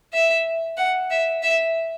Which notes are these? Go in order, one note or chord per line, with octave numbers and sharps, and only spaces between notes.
E5
F#5
E5
E5